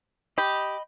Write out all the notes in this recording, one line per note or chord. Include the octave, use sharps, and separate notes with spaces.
G4 D#5 B5